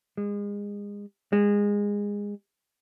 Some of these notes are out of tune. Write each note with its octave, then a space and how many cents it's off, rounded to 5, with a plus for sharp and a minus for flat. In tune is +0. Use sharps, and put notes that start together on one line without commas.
G#3 -30
G#3 -20